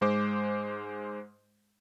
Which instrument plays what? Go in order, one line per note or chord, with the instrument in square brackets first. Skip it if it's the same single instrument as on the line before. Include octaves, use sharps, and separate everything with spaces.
[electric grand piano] G#2 G#3 C5 D6